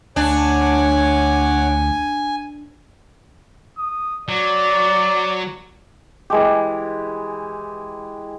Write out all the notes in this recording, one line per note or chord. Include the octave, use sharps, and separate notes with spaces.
D2 D4 C#5 F#5 G#5 D6
D#6
F#3 D5
E3 G#3 G4